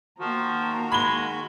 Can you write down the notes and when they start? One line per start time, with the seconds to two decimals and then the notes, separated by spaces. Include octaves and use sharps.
0.20 D#3 F3 A#3 F#4 A#5
0.92 G#3 B5 G7